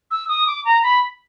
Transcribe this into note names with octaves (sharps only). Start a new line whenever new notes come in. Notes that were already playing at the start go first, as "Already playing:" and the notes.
E6
D#6
D6
A#5
B5